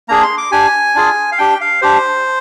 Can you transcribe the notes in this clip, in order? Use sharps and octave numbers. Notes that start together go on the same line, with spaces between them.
A#3 D4 G#4 A#5
C6
D6
D4 G4 G#5
D4 F4 G#4
F5
D4 G4 G5
F5
D4 G4 C5